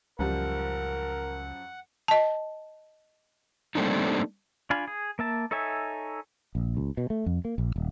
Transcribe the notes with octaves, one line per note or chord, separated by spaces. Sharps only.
C#2 F#2 F3 G3 A#4 F#5
D#5 A5
G3 A3 A#3 C4 D4 D#4
D4 F4 F5 G#5 B5
G#4
A#3 E5 A5
D#4 A4 C#5 E5 G#5
A#1
C#2
B2
A3
F2
A#3
A#1
D#1